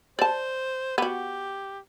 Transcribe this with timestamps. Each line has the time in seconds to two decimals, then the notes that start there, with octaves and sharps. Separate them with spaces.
0.19 C5 D5 A5
0.98 B3 F#4 G4